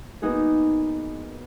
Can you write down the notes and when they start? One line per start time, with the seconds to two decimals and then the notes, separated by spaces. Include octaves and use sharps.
0.22 A#3 B3 D#4 F#4 G#4